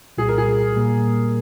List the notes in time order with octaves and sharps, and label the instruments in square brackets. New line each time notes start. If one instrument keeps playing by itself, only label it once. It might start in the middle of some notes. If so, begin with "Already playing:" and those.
[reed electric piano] C2 A#2 G3 [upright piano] G#4
[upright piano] A#4
G#4
[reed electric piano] A#2 G3 A#3